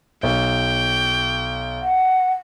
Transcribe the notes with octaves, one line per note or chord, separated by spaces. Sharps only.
B1 G5
F#5